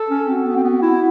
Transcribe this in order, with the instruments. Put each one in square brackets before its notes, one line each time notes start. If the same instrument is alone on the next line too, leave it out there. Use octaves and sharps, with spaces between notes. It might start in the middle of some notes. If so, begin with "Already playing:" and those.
Already playing: [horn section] A4
[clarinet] C#4
[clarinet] C4 [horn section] F#4
[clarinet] B3
C4
B3
E4